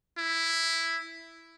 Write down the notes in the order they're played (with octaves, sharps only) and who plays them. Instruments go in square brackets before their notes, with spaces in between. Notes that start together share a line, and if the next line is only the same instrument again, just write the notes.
[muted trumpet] E4